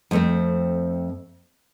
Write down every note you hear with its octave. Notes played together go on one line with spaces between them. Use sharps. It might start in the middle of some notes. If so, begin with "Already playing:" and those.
F2 A3 C4